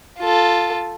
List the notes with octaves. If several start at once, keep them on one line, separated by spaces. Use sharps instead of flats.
F4 A4